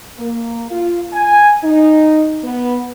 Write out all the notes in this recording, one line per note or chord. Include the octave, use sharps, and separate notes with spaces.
A#3
F4
G#5
D#4
B3